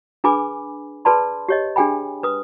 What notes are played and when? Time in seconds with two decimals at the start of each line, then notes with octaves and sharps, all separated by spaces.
0.24 D4 G#4 B4 G#5 B5 D6
1.05 G#4 B4 D5 A5 B5 C6
1.48 G4 C#5 D#5
1.76 D4 G4 G#4 G5 G#5 B5
2.23 B4 D#6